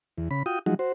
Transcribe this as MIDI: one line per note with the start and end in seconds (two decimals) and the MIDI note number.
0.18 0.29 40
0.31 0.43 49
0.31 0.43 83
0.46 0.59 65
0.46 0.59 66
0.46 0.59 79
0.46 0.59 87
0.66 0.74 53
0.66 0.74 54
0.66 0.74 56
0.66 0.74 63
0.66 0.74 66
0.79 0.92 66
0.79 0.92 72